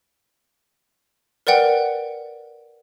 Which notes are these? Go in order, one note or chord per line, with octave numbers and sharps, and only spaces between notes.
A#4 B4 D5 F#5 G5